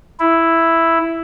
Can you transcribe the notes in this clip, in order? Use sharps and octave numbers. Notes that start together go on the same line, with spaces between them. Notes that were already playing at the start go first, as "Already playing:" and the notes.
E4